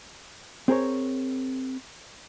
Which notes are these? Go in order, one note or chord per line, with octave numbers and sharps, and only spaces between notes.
C4 G#4 A#4 C#5